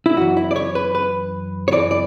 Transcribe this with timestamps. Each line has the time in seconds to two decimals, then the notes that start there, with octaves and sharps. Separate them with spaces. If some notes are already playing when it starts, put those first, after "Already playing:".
0.06 E4
0.17 F#2 E3 F#4
0.37 E4
0.51 D5
0.56 C#5
0.75 B4
0.95 B4
1.68 C#5
1.72 F#2 E3 D5
1.91 D5